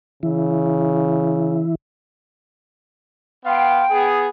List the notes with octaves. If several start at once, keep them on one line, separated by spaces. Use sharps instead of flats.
C#3 E3 E4
B3 F5 G5 C6
B3 G#4